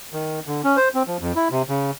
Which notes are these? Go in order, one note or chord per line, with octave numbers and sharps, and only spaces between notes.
D#3
D3
C#4
C5
C4
F3
F2
E4
C3
C#3